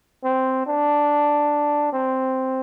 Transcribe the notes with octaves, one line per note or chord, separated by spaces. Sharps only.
C4
D4
C4